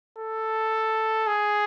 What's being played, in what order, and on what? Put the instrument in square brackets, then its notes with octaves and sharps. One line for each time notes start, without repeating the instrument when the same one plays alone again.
[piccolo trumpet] A4
G#4